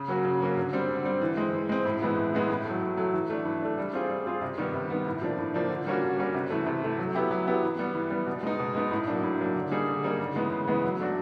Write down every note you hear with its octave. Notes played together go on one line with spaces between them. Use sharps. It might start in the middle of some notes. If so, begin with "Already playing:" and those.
Already playing: C#3
F#3 A#3 C#4 F#4
C#3
F#3 A#3 C#4 F#4
D3
G3 C4
D3
G3 C4
E3
G#3 C4
E3
G#3 C4
A2
E3 G#3 B3 E4
A2
E3 G#3 B3 E4
A2
F#3 A3
A2
F#3 A3
E3
A3 D4
E3
A3 D4
G3
C4 F4 G#4
G3
C4 F4 G#4
C3
D#3 G3 B3
C3
D#3 G3 B3
A2
F3 A#3 D4
A2
F3 A#3 D4
D3
G3 A#3 C#4 F#4
D3
G3 A#3 C#4 F#4
C3
E3 A3
C3
E3 A3
F#3
B3 E4 G4
F#3
B3 E4 G4
E3
G3 B3
E3
G3 B3
B2
G#3 B3 D#4
B2
G#3 B3 D#4
A2
F#3 A#3 D4
A2
F#3 A#3 D4
D3
G3 A#3 D#4 G#4
D3
G3 A#3 D#4 G#4
C#3
E3 G#3 B3
C#3
E3 G#3 B3
F#3
A3 D4 F#4